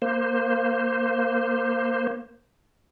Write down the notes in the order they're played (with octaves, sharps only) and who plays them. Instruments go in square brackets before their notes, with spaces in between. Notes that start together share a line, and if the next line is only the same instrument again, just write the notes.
[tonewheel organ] A#3 C5